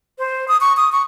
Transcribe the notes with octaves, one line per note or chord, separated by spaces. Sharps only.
C5
D#6
C#6
D#6
C#6